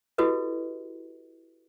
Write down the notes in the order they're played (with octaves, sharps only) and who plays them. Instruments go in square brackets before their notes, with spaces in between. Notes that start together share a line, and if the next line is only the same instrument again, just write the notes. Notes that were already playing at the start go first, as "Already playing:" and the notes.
[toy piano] E4 F#4 G4 A4 B4 D#5